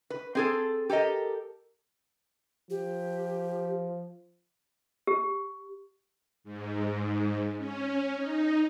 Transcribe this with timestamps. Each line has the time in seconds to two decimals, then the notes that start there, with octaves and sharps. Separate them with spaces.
0.10 B4
0.35 C4 G#4 A4
0.89 G4 A4 A#4 D#5
2.70 F3 G4
5.07 G4
6.44 G#2
7.58 C#4
8.16 D#4